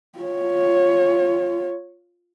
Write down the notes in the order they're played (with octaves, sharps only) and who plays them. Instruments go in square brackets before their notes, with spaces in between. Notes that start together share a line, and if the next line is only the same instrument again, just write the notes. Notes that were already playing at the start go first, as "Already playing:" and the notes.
[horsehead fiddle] F4 C#5